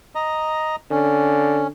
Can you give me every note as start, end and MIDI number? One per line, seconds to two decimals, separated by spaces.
0.15 0.76 75
0.15 0.76 82
0.91 1.68 50
0.91 1.67 61